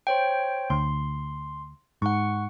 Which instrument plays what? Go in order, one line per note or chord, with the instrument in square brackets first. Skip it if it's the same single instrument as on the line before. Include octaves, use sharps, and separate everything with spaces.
[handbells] C5 C#5 G5
[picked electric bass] D2 [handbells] C6
[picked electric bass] G#2 [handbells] F#5 C#6